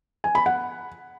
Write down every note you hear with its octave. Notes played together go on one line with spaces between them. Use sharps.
G#5
B5
F#5